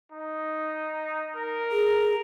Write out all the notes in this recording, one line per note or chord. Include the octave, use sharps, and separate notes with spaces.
D#4
A#4
G#4